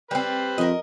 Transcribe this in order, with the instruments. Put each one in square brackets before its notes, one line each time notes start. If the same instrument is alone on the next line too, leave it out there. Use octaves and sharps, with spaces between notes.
[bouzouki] G3 C4 [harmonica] B4 C5
[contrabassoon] F2 [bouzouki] A#4 D#5